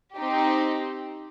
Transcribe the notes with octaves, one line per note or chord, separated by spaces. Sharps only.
C4 D#4 G4